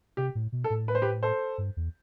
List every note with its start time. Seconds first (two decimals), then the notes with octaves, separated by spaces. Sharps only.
0.17 C3 G4
0.35 A2
0.52 B2
0.64 A4
0.70 A2
0.88 B4
0.95 C5
1.02 G4 B4
1.23 A4 C5
1.58 G2
1.77 E2